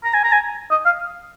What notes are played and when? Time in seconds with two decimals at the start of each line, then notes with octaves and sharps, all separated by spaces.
0.04 A#5
0.14 G#5
0.24 A#5
0.33 G#5
0.71 D#5
0.85 F5